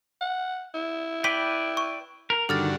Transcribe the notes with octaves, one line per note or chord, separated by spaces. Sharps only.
F#5
E4
B4 D5 G5 B6 D#7
C#6
A#4
G2 D3 D#3 F#4 A4 F6 A6